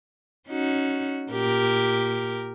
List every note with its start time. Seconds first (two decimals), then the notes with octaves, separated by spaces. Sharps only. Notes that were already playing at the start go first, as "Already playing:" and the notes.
0.49 C#4 D#4 F#4
1.31 A#2 G4 A#4